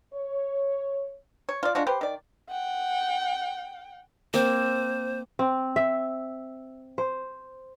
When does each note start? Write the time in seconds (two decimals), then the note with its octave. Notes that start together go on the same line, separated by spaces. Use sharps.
0.14 C#5
1.49 C#5
1.63 F4 D5
1.75 G#3 D4 F4 F#4
1.87 G4 B4 C5
2.01 D#3 D5
2.50 F#5 G5
4.34 A#3 C4 C5
5.39 C4
5.76 E5
6.98 C5